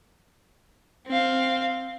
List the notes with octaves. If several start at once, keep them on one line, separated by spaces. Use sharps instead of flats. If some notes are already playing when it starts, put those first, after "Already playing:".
C4 F5